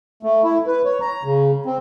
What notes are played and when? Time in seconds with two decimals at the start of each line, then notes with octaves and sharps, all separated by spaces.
0.23 A3
0.44 E4
0.66 B4
0.85 C#5
1.01 A#5
1.24 C#3
1.66 C4